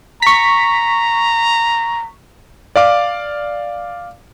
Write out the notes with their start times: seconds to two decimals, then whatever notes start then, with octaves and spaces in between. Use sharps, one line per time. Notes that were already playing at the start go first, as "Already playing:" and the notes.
0.22 A#5 C#6 B6
2.76 D5 F5 D6